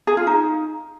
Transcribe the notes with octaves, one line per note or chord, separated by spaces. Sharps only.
G#4
F4
D#4